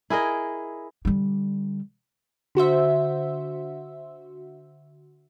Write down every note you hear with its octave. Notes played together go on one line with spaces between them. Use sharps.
E4 G#4 A#4 D#5
D3 G3
D3 F#4 C5 E5